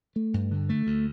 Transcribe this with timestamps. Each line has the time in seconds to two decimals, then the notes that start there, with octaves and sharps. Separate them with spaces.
0.16 A3
0.34 G2
0.51 D3
0.69 A3
0.87 D2